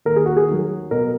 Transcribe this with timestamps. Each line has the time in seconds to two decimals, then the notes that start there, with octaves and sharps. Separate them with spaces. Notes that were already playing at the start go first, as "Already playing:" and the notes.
0.05 D#2 A#4
0.16 G#4
0.26 F#4
0.37 G#4
0.49 D#3 F#3
0.91 B2 A#4